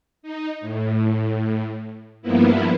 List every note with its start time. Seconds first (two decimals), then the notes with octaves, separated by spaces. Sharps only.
0.23 D#4
0.61 A2
2.22 G2 F3 A#3 B3 E4